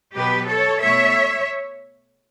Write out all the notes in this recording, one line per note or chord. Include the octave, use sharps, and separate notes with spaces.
B2 F#3 B3 G4 B4
A4 C#5
B2 A3 E4 C#5 E5